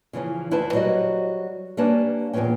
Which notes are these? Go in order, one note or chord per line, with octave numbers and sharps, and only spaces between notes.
C#3 E3 F3 C#4
D2 E4 B4 C5 F5 A5
F#3 G3 F#4 C5 D#5
G3 A#3 C#4 D4 B4 A5
E2 A#2 F3 B3 C#4 G5